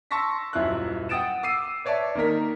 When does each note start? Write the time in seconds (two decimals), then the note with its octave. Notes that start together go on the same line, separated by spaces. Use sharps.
0.11 A5 C6 C#6 E6 A#6 B6
0.53 D#1 F#2 E4 F4 E5 F#6
1.09 F#5 G5 D#6 A6 D7 E7
1.43 D6 E6 C7 D#7
1.85 B4 C#5 D5 E5 A5
2.15 D#3 A#3 D#4 A#4 B6